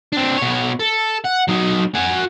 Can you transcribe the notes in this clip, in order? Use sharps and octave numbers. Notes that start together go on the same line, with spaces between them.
C4 D4
B2 C#5
A4
F#5
F#3 D#4
F#4 G#5